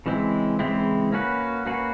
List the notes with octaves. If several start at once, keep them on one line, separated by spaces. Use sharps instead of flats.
C#3 E3 G#3 C4 E4
C#3 E3 G#3 C4 E4
A#3 C#4 F#4 B4
A#3 C#4 F#4 B4